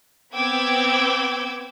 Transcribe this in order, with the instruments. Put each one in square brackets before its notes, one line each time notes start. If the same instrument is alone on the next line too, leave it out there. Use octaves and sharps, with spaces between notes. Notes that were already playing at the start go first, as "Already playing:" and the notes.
[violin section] B3 C4 G5 D6 E6 G#6